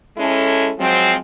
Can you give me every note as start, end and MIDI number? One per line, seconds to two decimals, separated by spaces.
0.18 0.72 56
0.18 0.72 61
0.18 0.72 64
0.18 0.72 69
0.79 1.15 53
0.79 1.15 54
0.79 1.15 56
0.79 1.15 60